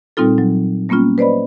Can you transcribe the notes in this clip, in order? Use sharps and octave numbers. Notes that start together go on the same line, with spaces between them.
A#2 G3 C4 D#4 F4 A4
F#3
G3 A#3 B3 C#4 F4
B4 C5 D5 D#5 B5